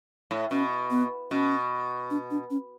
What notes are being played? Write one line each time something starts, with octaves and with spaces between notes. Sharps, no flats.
A2
B2 C#4
B3
B2 C#4
D4
D4
C#4